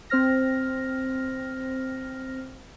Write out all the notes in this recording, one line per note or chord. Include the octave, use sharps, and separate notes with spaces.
C4 C5 F6 A#6